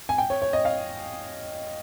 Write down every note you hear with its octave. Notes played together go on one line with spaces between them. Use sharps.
G#5
G5
C#5
C#5
D#5
F5